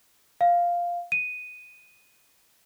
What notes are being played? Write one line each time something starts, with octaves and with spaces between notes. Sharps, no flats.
F5
D#7